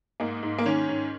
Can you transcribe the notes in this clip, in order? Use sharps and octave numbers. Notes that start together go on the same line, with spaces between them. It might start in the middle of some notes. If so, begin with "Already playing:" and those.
G#2 A#3 D#4
G#2
A#3
D#3 C#4
G#2